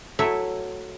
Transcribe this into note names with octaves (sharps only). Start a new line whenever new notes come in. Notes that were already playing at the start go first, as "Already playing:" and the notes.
F#3 A3 E4 C#5 E5